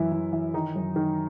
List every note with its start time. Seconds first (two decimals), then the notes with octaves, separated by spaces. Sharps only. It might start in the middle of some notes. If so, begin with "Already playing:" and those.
Already playing: F#2 E3 E4
0.12 E3
0.33 E3
0.54 D#3 D#4
0.76 F#2
0.96 D#3